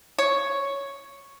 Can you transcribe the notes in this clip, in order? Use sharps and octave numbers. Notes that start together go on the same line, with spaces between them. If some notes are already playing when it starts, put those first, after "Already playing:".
C#5